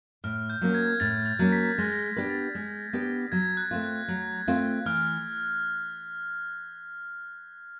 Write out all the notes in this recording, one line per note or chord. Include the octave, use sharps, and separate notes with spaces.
A2 F6
G6
F#3 A#3 C#4
G#6
A2 A6
A6
F#3 A#3 C#4
B6
G#3 A#6
A6
A#6
A#6
B3 D4 G4 B4
A6
G#3
B3 D4 G4 B4
F#3 G#6
F#6
A3 C4 F4
F#6
F#3
A3 C4 F4
E3 F6